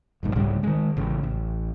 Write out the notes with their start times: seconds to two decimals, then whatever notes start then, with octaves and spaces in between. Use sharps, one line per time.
0.23 F1 A#1 G#2
0.35 C2 G#2 C#3 G3
0.63 D#3 G#3
0.97 A1 C#3
1.23 A1